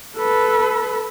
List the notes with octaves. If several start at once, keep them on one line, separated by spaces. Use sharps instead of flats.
A4 B4